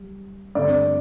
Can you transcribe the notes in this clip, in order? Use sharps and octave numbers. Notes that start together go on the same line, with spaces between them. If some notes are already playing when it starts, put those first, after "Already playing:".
Already playing: G3
G2 D3 A3 C4 D5